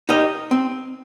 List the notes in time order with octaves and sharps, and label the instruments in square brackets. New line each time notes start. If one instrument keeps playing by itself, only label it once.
[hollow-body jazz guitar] D#4 G4 A#4 D#5
C4